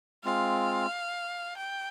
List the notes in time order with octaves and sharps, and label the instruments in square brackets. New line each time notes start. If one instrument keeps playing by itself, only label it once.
[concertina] G#3 C4 F4 [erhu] F5
[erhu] G5